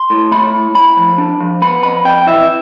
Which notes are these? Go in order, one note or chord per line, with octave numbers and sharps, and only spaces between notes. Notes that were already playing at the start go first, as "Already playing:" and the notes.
Already playing: C6
A2
A3 B5
A2
A2 B5
F3
D4
F3
B3 B5
F2 B5
F2 G5
E3 E5